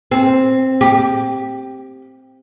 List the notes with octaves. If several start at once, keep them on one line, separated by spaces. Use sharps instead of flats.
C4
G4